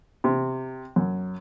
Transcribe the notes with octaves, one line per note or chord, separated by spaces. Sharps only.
C3
F#2